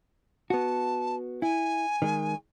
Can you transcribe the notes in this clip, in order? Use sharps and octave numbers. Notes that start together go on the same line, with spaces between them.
B3 F#4 A5
E4 G#5
D#3 G#3